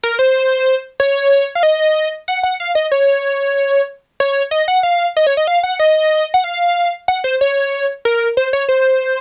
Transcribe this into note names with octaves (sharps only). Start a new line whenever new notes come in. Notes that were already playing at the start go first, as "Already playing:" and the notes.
A#4
C5
C#5
F5
D#5
F#5
F#5
F5
D#5
C#5
C#5
D#5
F#5
F5
D#5
C#5
D#5
F5
F#5
D#5
F#5
F5
F#5
C5
C#5
A#4
C5
C#5
C5